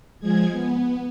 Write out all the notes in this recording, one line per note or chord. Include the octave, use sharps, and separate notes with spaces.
F3 G#3 G#4 G#6
B3